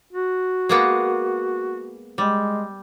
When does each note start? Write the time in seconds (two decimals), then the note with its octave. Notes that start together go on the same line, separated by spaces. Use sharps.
0.13 F#4
0.69 G#3 A#3 B3
2.18 G3 G#3